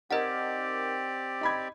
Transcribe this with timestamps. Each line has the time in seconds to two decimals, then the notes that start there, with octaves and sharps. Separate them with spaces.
0.11 C4 D#4 G4 A#4 D5 D#5 F#5
1.41 D#4 B5 G#6